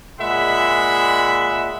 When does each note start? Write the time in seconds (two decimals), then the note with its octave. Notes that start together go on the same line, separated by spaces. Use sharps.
0.19 A#2 G#3 E5 F#5 B5